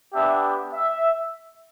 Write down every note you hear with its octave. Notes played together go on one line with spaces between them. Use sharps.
B3 D4 G4 E5
E5